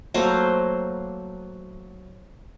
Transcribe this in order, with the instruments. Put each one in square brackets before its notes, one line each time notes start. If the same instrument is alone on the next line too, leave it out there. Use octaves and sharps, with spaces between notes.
[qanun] F#3 A3 A#3 C5